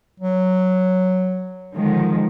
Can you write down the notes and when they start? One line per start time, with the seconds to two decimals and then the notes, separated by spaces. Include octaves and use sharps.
0.20 F#3
1.75 D3 D#3 F3 G#3